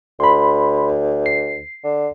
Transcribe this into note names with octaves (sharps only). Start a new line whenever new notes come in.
D2 B5 C6
C7
D3